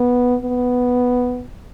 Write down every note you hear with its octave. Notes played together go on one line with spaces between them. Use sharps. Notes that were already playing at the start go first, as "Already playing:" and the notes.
Already playing: B3
B3